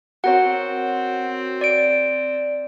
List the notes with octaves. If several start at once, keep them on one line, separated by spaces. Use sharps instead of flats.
C4 F#4 A#4 C#5 F#5
D5 D7